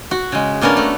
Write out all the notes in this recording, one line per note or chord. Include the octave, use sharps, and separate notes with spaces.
F#4
C#3 G#3
A#3 B3 C#4 D4 A#4
A3